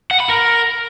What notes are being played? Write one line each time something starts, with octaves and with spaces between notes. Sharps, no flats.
F#5
B5
A#4